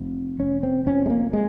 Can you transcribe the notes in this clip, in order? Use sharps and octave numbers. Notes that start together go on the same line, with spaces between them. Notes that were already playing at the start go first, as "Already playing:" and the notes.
Already playing: F1 C3
F1 C#4
C4
F2 C#4
G#3
A#3
G#3